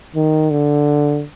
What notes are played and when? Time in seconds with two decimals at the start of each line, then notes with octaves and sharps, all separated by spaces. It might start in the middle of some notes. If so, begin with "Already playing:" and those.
0.16 D#3
0.51 D3